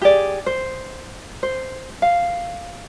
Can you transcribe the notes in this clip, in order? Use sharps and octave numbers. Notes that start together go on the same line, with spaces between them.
G4 G#4 D5
C5
C5
F5